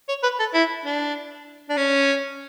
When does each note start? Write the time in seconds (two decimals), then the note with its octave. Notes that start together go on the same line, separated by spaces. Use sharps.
0.09 C#5
0.23 B4
0.40 A4
0.54 E4
0.85 D4
1.70 D4
1.77 C#4